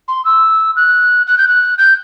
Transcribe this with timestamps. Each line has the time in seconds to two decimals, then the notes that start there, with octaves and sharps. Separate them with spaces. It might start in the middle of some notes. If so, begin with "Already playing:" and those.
0.08 C6
0.25 E6
0.76 F#6
1.27 F#6
1.38 G6
1.48 F#6
1.78 G6